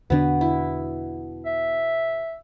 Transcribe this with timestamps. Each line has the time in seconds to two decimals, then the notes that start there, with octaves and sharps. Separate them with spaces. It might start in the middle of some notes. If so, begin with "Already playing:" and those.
0.10 E2 B2 D3 B3 D4
0.41 E4
1.46 E5